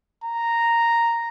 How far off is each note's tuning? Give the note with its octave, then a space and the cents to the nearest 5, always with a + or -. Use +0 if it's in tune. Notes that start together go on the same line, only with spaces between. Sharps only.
A#5 -5